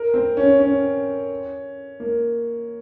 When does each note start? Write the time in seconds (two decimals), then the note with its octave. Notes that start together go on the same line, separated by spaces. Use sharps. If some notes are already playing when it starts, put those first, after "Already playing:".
Already playing: A#4
0.14 C4
0.37 C#4
0.60 C#4
2.00 A#3